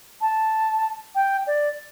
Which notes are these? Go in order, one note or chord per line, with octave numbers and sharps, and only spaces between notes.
A5
G5
D5